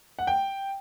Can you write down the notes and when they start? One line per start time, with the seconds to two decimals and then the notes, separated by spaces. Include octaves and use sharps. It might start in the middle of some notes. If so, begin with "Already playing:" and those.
0.19 F#5
0.27 G5